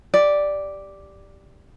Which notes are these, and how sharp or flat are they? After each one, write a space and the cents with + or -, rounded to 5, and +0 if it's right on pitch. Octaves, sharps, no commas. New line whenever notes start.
G4 +0 D5 +0